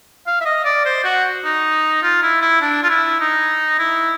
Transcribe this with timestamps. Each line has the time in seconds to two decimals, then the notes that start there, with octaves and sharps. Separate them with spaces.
0.27 F5
0.41 E5
0.45 D#5
0.65 D5
0.85 C5
1.04 F#4
1.44 D#4
2.03 F4
2.23 E4
2.42 E4
2.62 D4
2.83 F4
2.90 E4
3.20 D#4
3.79 E4